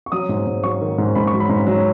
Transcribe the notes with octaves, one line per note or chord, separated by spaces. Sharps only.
C#6
F#3 D#6
G#2
G#2
F#3 C#6
D#3
G#2
G#2 B5
C#6
F#3
B5
G#2
F#3